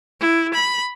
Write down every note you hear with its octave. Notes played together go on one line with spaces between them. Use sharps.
E4
B5